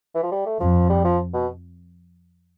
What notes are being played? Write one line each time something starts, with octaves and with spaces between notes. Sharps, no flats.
E3
F3
G3
A3
F2 F3
G3
F3
B2